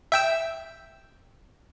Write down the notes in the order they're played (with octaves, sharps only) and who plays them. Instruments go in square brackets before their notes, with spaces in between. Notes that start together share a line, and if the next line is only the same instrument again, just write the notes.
[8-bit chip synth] E5 G5 E6